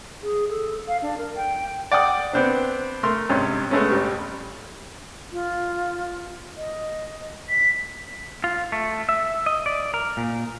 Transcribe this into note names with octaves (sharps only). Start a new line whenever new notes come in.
G#4
A4
F5
D4
A#4
G5
D5 F#5 G5 D#6
B3 C4 D4
A3 A#4 C6
G#1 G2 C3 C#4
G#3 A3 B3 C#4
A1 G3
F4
D#5
B6
F4
A3
E5
D#5
D5
A#4
A#2